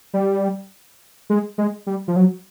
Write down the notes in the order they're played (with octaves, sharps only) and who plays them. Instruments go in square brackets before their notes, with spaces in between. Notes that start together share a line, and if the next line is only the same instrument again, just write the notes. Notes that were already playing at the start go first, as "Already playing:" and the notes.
[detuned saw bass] G3
G#3
G#3
G3
F3
F#3